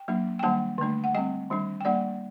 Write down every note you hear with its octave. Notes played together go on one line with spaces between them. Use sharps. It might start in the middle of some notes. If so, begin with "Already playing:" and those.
Already playing: G5
F#3 A#3 D4
G5
D#3 G3 A#3 D4 F#5 A5
D3 A3 D4
F#5
G3 C4 D#5 G5
D#3 G3 D4
G5
G3 A#3 D4 D5 F#5